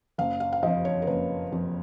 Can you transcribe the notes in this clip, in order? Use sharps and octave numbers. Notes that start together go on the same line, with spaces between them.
F#1 F5
F5
F5
F2 F3 D#5
C#5
A#4
F#1 B4
F2 F3